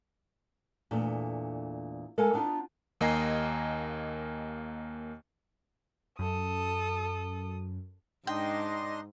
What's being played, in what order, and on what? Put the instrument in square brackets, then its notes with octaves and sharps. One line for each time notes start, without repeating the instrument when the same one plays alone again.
[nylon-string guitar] E2 A#2 A3 D4
G#3 A4 A#4 F5 F#5 G#5
B3 D4 D#4 F4
[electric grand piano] D#2 A#3 D#5 G#5 A#5 C7
[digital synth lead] F#2 [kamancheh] A4 D#6
[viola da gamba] G#2 [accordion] D4 D#5 C6 [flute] D#4 [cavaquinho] G5